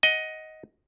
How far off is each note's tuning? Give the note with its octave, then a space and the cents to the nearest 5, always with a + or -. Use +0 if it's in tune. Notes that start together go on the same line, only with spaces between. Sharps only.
D#5 +10 F#5 +5